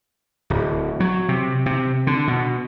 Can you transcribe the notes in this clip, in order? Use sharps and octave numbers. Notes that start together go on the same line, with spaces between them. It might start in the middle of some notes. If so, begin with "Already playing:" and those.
D1
F#3
C3
C3
D3
B2